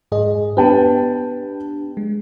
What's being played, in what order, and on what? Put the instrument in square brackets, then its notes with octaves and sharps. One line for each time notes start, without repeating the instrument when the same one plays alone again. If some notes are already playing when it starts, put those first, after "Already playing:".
[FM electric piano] G#2 G#4 D#5
[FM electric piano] B3 D4 G4 [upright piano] B4 G5 A5
[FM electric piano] G#3